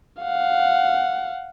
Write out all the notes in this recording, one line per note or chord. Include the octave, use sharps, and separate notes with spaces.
F5 F#5